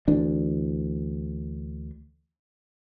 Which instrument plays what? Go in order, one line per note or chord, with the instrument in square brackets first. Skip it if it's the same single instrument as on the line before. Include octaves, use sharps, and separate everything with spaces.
[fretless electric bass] D2 E3 D4